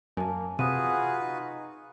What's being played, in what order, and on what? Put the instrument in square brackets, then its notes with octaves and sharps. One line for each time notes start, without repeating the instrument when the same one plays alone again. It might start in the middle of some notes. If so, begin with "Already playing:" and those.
[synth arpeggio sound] F#2 [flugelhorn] A#3 [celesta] G#5 A5
[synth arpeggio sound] C3 [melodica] F4 F#4 B4 [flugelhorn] G#4 [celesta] D#6 D#7
[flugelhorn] D#4